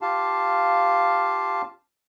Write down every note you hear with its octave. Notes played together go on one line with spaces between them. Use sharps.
F4 G4 F5 A5